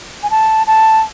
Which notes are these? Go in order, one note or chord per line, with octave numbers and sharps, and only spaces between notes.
G#5
A5
A5